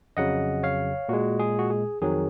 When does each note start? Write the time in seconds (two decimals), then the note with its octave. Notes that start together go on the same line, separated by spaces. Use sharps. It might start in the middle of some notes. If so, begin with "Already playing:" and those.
0.17 F2 C#3 F#3 D#5 F#5
0.63 C#5 F5
1.09 A#2 G#3 F#4
1.39 G#4
1.59 F#4
1.70 G#4
2.01 F2 D#3 F#3 G#4